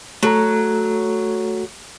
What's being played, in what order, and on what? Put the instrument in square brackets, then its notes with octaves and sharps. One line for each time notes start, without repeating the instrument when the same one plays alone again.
[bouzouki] F#3 [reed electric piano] A3 A4 A#5